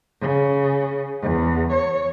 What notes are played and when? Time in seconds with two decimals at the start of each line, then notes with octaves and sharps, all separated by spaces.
0.21 C#3
1.21 E2
1.73 C#5